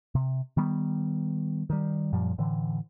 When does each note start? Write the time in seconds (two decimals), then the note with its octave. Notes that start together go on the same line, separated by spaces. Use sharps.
0.15 C3
0.57 D#3 G3 B3
1.70 D#3 G3
2.13 F#2 A#2 F3 G3
2.38 A2 D3 E3